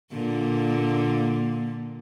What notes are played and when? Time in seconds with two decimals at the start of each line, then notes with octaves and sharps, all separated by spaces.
0.12 A#2 D3 A#3